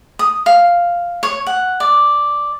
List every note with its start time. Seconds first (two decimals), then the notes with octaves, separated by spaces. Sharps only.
0.19 D#6
0.46 F5
1.23 C#5
1.47 F#5
1.80 D5